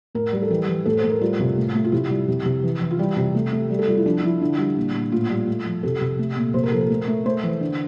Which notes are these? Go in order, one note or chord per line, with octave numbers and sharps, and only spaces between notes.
A2 A#4
G3 A#4
A4
E3 G4
E3
A2 A4
C5
A2
A#4
G3 F4
C3
A2
A3
F4
C3 E4
G3
C3
C3
E3
E3
F4
G3 G4
C3
A3
A3
G3
A4
G3 F4
E4
F3 D4
D4
F3 E4
D3
G3
A#2
A#2
A2 F4
G3
A3
F3
C3 A4
C3
A3
A#2
C3 C5
A#4
F3 A4
A#4
A3
A3
A3 C5
E3
D3